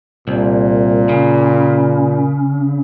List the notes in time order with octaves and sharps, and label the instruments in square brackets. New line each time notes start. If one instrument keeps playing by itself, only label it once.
[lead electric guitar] C2 [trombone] A#2
[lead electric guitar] C#3